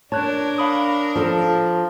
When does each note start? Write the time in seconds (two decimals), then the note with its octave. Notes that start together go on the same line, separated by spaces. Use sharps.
0.12 D4 A#4 C#5 A5 F#6 G#6
0.58 F5 B5 D#6
1.16 F3 A4 A5